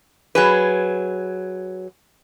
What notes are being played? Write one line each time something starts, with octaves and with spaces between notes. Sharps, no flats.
F#3 G#4 B4